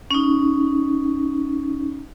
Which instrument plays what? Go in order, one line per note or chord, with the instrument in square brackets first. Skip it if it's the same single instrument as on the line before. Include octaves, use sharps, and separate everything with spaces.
[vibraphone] C#4 D#4